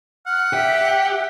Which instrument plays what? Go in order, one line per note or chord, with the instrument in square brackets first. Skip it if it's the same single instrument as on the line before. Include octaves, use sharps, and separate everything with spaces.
[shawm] F#5 [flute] F6
[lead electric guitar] G4 [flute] E5
[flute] E5